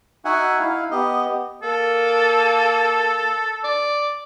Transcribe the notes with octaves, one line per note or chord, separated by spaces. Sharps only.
D#4 F#4 E5 F#5 G#5
D#4 E4 F5
B3 G4 D#5
A#3 A4
D5